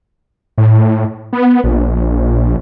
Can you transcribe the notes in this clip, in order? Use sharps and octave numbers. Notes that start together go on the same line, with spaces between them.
A2
B3
A#1